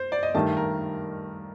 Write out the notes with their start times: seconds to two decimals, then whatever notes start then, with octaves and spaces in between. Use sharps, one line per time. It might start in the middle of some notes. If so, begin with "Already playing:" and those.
Already playing: C5
0.12 D5
0.23 D#5
0.34 G2 D#3 A3 A5
0.57 A#4